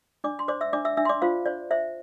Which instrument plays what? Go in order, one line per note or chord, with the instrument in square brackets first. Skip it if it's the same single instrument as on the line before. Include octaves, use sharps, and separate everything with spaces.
[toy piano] D4 D5 D6
C6
C5 D5 D6
E5 E6
D4 D5 D6
E5 E6
D4 E5 E6
C6
D5 D6
F4 C5 F5
C5 D5
C5 E5